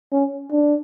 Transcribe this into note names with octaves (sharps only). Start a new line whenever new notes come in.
C#4
D4